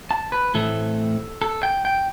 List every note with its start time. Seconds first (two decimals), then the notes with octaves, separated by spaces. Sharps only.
0.11 A5
0.32 B4
0.54 A2 E3 A3 C4 A4
1.42 A4
1.63 G5
1.85 G5